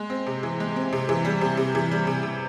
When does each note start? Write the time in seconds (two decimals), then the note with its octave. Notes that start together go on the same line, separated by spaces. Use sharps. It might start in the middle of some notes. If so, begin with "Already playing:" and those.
Already playing: G#3
0.10 C4
0.27 C3
0.43 E3
0.60 G#3
0.76 C4
0.93 C3
1.09 E3
1.25 G3
1.41 C3
1.57 C3
1.75 E3
1.91 G3
2.07 C3
2.23 C3